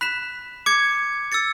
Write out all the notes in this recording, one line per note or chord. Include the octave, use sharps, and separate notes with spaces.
B5 F#6 B6 E7
D6 G#6 C#7
E6 A6 C#7